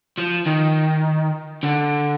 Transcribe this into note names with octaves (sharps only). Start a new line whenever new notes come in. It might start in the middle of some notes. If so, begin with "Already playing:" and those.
F3
D#3
D3